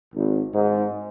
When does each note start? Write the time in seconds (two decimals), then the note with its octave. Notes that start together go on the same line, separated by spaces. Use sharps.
0.15 G#1
0.55 G#2